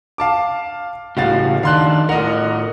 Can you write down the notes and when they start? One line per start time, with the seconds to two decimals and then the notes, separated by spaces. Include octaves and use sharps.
0.18 F5 A5 D6
1.17 A2 C#3 F#4 G4 F5 A6
1.63 D#3 D4 F5 C6 F#6
2.09 A2 A#4 D#5 F#5